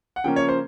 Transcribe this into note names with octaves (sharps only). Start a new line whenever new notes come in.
F#5
C#3 F3 A#3 C#4 G5
C#5
C5